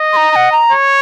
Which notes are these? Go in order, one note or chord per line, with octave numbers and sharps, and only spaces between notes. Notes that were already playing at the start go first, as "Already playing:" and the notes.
Already playing: D#5
C6
A#5
A#5
F#5
A#5
C#5